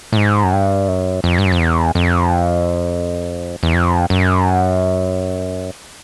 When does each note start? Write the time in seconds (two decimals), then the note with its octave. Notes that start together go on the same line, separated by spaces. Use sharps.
0.13 A2
0.17 G#2
0.44 F#2
0.53 G2
0.88 F#2
1.24 F2
1.38 G2
1.46 F#2
1.52 F2
1.59 E2
1.95 F2
3.63 E2
3.74 F2
4.10 F#2